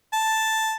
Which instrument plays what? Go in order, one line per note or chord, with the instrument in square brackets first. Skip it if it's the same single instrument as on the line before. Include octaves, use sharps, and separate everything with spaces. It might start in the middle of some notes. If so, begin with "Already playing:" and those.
[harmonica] A5